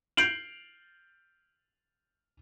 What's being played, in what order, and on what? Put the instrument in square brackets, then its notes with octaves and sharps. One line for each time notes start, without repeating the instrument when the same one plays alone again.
[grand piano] G6 C7 D7 F7 F#7